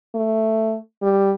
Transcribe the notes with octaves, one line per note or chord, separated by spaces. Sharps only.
A3
G3